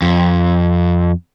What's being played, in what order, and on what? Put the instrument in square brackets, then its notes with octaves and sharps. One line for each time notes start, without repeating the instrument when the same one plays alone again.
[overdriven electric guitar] F2